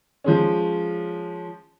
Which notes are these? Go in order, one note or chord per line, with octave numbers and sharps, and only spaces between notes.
F3 G#3 C#4